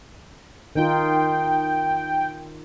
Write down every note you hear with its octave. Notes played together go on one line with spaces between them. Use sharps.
D#3 D#4 F4 G5